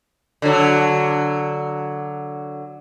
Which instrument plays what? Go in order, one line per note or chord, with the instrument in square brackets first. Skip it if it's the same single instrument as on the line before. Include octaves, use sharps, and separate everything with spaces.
[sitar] D3 F#3